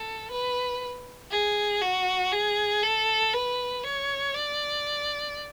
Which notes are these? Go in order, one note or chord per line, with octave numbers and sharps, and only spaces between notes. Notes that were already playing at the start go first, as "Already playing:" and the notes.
Already playing: A4
B4
G#4
F#4
G#4
A4
B4
C#5
D5